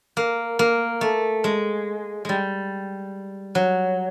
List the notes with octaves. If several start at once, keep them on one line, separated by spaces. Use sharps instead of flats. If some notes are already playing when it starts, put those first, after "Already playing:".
A#3
A#3
A3
G#3
G3 G#3
F#3